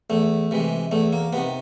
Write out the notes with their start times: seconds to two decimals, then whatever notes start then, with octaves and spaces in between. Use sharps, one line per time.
0.10 E2 A3
0.51 C3 E3 G#3
0.91 E2 A3
1.13 A#3
1.33 C3 D#3 B3